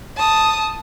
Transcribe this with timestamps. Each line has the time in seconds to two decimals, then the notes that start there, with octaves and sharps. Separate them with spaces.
0.17 A5 D#6